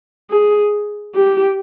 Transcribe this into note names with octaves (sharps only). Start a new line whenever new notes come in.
G#4
G4